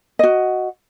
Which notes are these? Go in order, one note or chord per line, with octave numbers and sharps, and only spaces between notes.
F#4 D#5